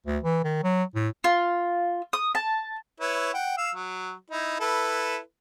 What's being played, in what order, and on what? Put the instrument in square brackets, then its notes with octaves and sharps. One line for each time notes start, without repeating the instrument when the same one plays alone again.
[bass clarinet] D2
E3
D#3
F#3
A2
[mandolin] F4
D#6
A5
[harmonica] E4 B4 C#5
F#5 G5
F5 E6
F#3
D#4 E4
E4 A4 B4